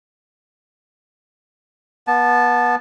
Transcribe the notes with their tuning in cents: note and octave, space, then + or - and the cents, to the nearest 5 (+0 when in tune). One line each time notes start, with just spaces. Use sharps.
B3 -30 A5 -10